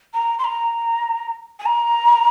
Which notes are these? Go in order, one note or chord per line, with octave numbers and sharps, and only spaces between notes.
A#5
C6
A#5
G#5
A#5